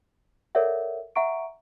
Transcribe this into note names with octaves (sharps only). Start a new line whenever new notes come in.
A4 A#4 C#5 D5 E5 F#5
E5 F#5 A#5 C#6 D7